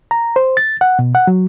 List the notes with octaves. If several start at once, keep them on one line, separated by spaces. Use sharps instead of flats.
A#5
C5
A6
F#5
B2
F#5
F#3